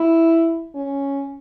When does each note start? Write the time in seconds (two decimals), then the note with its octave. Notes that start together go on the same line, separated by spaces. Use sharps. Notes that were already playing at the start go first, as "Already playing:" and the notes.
Already playing: E4
0.75 C#4